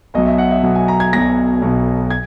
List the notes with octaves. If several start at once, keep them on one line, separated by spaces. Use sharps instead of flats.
B1 B2 F#3 D#5
E5
F#5
E5
B1 B2 F#3 F#5
G#5
A#5
G#6
B1 B2 F#3 A#6
B1 B2 F#3
G#6